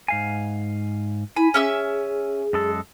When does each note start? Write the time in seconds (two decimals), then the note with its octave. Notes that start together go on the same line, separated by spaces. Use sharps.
0.08 G#2 F5 G#5
1.36 E4 G#5 B5
1.54 C#4 G#4 E5 E6
2.53 F#2 G#3 A4